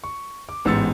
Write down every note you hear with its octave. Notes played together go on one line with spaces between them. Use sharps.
C#6
D6
A1 G#2 B3 E6 A6 C#7